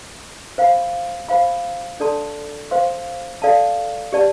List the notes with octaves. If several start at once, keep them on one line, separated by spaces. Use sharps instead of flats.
C5 F5 B5
C5 F5 B5
D4 A4 D5 A5 C6
C5 F5 C6
A4 D5 F5 A5
G4 D5 A5